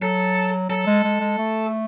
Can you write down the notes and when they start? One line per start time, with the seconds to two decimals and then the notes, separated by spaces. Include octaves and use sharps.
0.02 F#3 A4
0.70 F#3 A4
0.87 G#3
1.04 G#3
1.20 G#3
1.38 A3